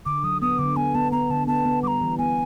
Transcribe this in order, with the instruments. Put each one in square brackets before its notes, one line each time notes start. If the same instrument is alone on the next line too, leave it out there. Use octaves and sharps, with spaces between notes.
[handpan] D3 [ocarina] D6
[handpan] F#3 [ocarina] D#6
[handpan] B3 [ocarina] D#6
[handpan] D3 [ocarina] D6
[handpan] B3 [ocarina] G#5
[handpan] B3 [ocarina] A5
[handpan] B3 [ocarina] A#5
[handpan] D3 [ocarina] A5
[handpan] B3 [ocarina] A5
[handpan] B3
[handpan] G3 [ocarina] A#5 D6
[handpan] E3
[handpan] B3 [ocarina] G#5